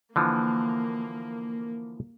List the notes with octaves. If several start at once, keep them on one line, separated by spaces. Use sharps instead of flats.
D3 E3 F3 A#3